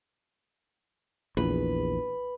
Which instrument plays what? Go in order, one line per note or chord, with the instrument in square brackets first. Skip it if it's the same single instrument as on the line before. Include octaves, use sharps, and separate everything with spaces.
[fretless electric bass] A#1 E2 [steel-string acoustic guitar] B4